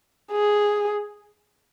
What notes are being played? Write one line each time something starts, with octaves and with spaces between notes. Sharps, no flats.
G#4